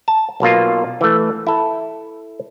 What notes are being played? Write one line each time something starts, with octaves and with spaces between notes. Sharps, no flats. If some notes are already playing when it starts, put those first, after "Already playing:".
A5
B1 B2 A#3 F4
E3 A3
E4 A4